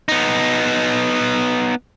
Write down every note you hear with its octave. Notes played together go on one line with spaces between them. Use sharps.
B3 D#4